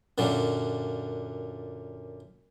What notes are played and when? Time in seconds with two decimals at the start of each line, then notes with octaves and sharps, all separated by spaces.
0.18 F#2 A#2 D3 F#3